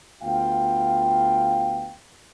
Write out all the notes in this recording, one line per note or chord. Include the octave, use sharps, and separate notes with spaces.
D2 B3 F4 F5 G5